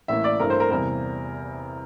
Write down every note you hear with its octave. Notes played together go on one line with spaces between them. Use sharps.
A1 A2 E3 A#3 E5
D5
G2 E3 A3 C4 A#4
C5
A#4
E2 C3 G3 A#4